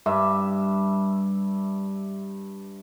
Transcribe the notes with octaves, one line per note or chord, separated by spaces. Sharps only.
G2 E5